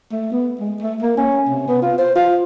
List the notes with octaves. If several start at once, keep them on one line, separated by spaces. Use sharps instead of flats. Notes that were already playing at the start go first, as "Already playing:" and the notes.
A3
B3
G#3
A3
A#3
C#4
C3
B3
F4
C5
F4